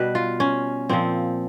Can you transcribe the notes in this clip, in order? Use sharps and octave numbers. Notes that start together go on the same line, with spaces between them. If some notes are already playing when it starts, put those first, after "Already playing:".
Already playing: B2 G3 B4
F4
C#4
A#2 F3 C4